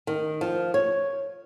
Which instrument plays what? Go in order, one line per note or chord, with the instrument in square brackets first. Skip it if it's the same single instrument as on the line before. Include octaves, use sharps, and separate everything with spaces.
[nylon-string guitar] D#3
F3
C#5